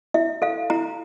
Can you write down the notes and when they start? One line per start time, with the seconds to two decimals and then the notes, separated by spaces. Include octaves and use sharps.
0.14 E4 E5
0.42 A4 F5
0.70 E4 A#5